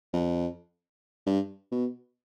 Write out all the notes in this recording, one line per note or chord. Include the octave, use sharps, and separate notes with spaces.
F2
G2
B2